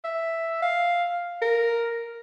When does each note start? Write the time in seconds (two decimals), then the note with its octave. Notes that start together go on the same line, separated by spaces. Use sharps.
0.05 E5
0.63 F5
1.42 A#4